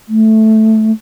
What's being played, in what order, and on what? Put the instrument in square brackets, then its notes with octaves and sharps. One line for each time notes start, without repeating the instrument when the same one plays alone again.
[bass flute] A3